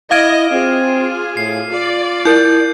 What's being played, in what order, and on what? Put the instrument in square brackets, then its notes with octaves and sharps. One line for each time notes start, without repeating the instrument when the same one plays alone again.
[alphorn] E4 [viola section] D#5 [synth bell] F5 G#6 D7 [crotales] D6 F6 D#7
[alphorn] C4 [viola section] F4 G#4
[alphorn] A2 [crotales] C7
[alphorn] F4 [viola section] D5
[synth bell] E4 A#4 [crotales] G6